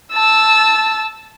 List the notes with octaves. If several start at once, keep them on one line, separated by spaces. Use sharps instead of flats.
A5 E6